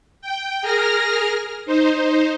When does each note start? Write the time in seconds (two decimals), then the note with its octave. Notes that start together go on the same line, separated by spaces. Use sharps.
0.22 G5
0.62 G#4 A#4 F6 A#6
1.66 D#4 C5